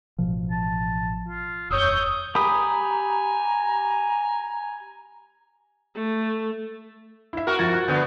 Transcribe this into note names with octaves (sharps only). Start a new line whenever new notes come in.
A1 B2 F3
A5
F4
E1 F#2 C#5 D#6 E6 G6
G4 G#5 A#5 B5 D#6
A3
E4 E5
F#4 A#4
F2 G#6 A6
F#6
D3 B3 G6